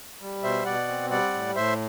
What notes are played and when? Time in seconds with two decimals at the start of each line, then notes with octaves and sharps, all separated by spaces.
0.21 G3
0.43 B2 C5 E5
0.65 B2 D5 F#5
0.88 C4
1.11 G3 D5 F#5
1.33 A2
1.55 A2 C5 E5